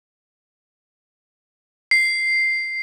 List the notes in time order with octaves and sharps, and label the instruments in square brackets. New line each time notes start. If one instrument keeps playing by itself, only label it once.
[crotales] C7